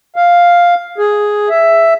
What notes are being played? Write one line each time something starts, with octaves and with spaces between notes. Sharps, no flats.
F5
G#4
E5